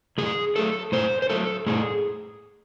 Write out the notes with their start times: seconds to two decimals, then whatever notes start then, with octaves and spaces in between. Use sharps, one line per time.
0.18 A2 G#4
0.56 F#3 A3 A4
0.92 A2 C5
1.22 C5
1.30 F#3 A3 A4
1.66 A2 G#4